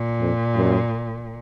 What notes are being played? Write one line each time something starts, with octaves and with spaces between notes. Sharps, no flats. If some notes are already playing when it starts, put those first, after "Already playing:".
Already playing: A#2
F2
F#2